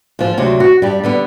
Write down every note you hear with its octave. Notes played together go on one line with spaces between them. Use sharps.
G#2 F3
D2 C3 F#3
F#4
G2 G3
D3 G3 B3